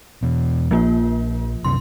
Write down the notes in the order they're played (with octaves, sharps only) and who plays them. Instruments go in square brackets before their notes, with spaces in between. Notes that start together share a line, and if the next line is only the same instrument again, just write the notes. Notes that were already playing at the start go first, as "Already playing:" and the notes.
[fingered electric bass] E2 B2
[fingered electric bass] A#1 [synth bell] F3 A#3 F4
[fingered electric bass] C2 F#2 C3 [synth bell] C6